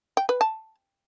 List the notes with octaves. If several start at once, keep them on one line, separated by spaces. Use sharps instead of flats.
G5
B4
A5